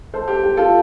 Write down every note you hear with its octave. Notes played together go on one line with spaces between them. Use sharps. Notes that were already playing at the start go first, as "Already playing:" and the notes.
A4 C5
G4
G4
F4 A4